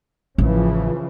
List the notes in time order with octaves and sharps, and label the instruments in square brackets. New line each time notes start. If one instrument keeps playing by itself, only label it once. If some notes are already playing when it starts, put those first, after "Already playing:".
[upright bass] A1 [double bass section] C#3 E3 F3